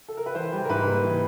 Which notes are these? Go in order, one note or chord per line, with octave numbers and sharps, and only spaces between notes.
A4
A#4
B4
E3 C5
G3
A#4
G#2 B4
A#3
E3